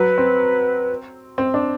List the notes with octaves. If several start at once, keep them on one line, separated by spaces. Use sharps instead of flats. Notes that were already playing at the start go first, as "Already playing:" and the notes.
Already playing: F#3 B4
C4
C4
D4